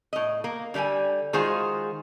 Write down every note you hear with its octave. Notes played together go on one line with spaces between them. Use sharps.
A2 D#5
A#3
D3 G3 F5 G5 G#5
D#3 G#3 F4 F#4 G#4 C5